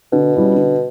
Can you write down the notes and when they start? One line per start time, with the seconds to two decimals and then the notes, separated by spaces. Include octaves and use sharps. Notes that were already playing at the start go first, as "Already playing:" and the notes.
0.12 B2 D3
0.34 G3 C#4 E4 B4
0.56 D3